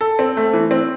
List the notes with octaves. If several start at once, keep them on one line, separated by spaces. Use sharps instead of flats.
A4
C4
A3
E3
C4